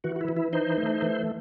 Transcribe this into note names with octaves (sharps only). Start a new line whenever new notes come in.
E3 F#4
F#4
E4
E3
E4
D#4 C5
A3
E3